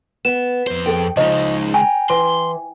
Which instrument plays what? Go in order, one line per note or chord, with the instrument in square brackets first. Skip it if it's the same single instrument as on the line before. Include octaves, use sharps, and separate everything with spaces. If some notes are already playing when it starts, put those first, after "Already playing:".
[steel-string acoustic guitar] B3 [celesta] E7
[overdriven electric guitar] F2 C5
[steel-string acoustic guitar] G#4 A4 G5
[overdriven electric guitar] C#3 G#3 [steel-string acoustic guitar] F3 D#4 [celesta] D#5
[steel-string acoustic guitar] G5 A#5 [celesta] G#5
[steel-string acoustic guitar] E3 [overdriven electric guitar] C6